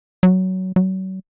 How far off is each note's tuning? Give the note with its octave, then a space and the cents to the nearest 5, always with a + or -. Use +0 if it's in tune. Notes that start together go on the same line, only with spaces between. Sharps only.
F#3 +15
F#3 +35